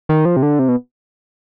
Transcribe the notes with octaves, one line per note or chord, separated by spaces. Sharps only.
D#3
F3
C3
D3
C3
B2